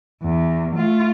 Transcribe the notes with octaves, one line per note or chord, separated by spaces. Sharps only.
E2
A3 F4